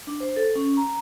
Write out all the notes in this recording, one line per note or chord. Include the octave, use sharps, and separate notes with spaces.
D4
C5
A4
C#4
A#5